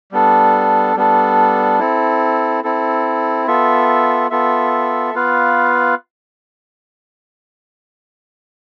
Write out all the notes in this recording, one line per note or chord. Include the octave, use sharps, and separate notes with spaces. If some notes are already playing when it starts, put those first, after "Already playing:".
G3 B3 D4 A4
G3 B3 D4 A4
C4 E4 A4
C4 E4 A4
B3 F4 A4 E5
B3 F4 A4 E5
B3 F4 B4 F5